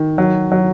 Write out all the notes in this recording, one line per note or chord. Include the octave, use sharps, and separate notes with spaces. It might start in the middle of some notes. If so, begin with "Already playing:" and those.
Already playing: D#3
F#3
F#3